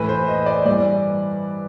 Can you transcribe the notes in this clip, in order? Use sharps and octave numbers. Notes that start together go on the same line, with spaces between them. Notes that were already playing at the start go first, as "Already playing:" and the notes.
Already playing: A2 E3 B4
C5
D#5
D5
G2 E3 D5